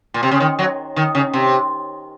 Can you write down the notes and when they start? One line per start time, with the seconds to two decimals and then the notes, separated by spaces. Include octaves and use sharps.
0.14 A#2
0.23 C3
0.31 C#3
0.40 D#3
0.59 F#3
0.96 D#3
1.15 C#3
1.34 C3